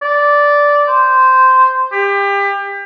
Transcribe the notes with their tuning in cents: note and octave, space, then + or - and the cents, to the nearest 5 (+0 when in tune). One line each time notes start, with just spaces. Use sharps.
D5 -10
C5 -10
G4 +30